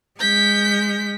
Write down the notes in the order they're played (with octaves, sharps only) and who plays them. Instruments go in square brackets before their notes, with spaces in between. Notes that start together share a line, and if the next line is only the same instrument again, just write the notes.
[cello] G#3 [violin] G6 B6